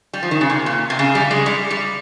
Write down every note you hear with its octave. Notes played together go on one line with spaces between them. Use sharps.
G3
F3
D#3
C#3
C3
A#2
C3
C#3
G3
G#3
G3
G3